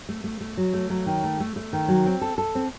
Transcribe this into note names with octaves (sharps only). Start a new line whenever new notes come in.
A3
A3
A3
F#3
A3
F#3
D#3
A3
A3
A3
D#3
F#3
C4
A4
A4
C4